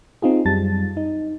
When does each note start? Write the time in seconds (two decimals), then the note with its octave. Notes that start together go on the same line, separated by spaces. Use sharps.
0.22 C4 D#4 F4 G#4
0.45 F#2 G3 A5 A6
0.97 D#4